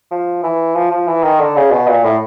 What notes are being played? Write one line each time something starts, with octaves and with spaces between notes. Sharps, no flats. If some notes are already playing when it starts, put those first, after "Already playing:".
F3
E3
F3
F3
E3
D#3
D3
C#3
B2
A#2
A2